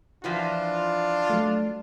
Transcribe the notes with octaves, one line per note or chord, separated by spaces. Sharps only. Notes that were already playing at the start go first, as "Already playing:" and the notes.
E3 F3 D4 F4 F#4
F#3 A3